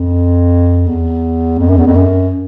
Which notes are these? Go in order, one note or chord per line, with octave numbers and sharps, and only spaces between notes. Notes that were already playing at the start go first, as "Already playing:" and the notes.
Already playing: F2
E2
F2
F#2
E2
F2
F#2